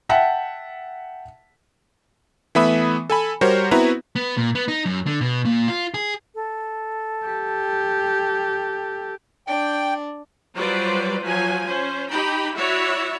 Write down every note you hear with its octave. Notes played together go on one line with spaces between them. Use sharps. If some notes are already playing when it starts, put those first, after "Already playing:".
E5 F#5 G5 A5 B6
E3 A3 B3 E5 B5 D#6
A4 G#5 B5
G3 F#4 A#4 C5 C#5
B3 C4 E4 F#4 B4 A#5
B3
A#2
B3
D#4
F#2
D3
B2
A#2
F4
G#4
A4
G4
D4 G5
F#3 G3 F4 B4 C5 D5
F3 F#3 G#5
C#4 C5
D#4 G4 G5 B5
E4 F#4 C#5 D5 E5